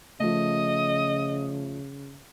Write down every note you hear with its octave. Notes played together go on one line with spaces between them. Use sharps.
C#3 F3 A3 D#5